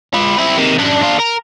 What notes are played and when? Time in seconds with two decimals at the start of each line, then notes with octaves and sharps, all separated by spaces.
0.14 F4 B4
0.38 C4 E4
0.57 C3 D#3
0.78 F#2 D4
1.02 D4 F4
1.19 A#4